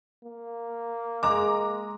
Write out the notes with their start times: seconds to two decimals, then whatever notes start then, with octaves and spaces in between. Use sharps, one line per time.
0.25 A#3
1.23 G#3 A#5 D6